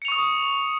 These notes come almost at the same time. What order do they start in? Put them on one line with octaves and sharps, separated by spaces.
C#7 F7 C#6 D#6